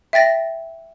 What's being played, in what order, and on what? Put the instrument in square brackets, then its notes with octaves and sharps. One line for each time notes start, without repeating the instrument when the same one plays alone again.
[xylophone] E5 G5 A6 A#6